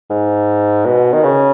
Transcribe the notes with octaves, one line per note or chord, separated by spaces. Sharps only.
G#2
B2
D#3
C#3